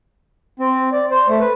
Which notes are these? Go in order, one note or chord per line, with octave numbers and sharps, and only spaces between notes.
C4
D5
C5
A3
B4